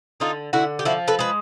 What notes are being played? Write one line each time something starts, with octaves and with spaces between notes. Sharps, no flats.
D3 D#4 F4
D3 E4 F#4
G4
F3 E4 F#4
A4 B4
G#3 B4